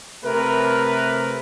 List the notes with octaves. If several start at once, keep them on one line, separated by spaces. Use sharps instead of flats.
C3 A3 A#4 B4